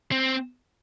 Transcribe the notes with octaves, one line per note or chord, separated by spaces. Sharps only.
C4